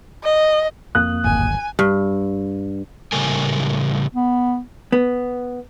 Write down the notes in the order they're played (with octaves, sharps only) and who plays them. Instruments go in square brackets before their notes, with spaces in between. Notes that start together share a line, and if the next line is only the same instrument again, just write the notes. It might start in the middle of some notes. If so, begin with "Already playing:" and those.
[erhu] D#5
[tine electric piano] F2 A#3 D#6 [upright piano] F#6
[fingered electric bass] D1 G#1 [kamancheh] G#5
[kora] G2
[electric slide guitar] A2 C#3 G3 A3 A#4 G#5
[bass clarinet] B3
[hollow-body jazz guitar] B3